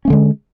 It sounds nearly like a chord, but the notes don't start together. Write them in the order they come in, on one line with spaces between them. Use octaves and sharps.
C#4 A3 D3 G#3